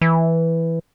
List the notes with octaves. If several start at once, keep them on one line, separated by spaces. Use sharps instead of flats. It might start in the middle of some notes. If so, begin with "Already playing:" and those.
E3